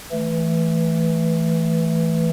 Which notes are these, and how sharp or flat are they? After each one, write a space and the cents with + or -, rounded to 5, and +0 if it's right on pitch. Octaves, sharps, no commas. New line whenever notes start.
E3 +0 A3 +0